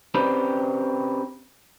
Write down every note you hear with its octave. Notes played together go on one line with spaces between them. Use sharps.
C4 C#4 G4 B4 C5 D5